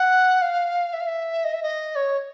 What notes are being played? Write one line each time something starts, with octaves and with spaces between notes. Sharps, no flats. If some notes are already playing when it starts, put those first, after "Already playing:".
Already playing: F#5
F5
E5
F5
E5
D#5
E5
D#5
C#5